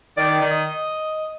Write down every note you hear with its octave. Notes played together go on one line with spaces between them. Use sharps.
D#3 D5
D#3
D#5